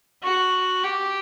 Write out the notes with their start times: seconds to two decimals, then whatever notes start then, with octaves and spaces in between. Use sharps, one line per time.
0.23 F#4
0.83 G4